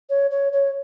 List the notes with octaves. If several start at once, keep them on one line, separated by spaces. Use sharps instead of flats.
C#5
C#5
C#5